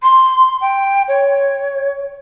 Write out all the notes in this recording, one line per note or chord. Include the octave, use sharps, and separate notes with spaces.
C6
G5
C#5